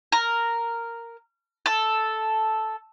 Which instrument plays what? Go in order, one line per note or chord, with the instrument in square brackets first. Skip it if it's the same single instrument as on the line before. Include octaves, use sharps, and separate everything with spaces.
[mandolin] A#4
A4